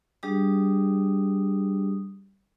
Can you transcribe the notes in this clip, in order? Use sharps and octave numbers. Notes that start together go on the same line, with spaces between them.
G3 D4 G4 G#4 D#6